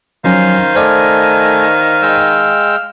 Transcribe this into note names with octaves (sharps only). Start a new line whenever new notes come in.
D#3 F3 F#3 C#4 C5 F5
A3 C5 D5 D#5 F5 G#5
G#3 G5 E6